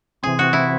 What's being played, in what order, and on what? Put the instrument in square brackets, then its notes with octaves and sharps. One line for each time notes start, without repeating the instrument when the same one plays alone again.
[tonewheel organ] C3 E3 C4 [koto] G#4
[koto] F#4
E4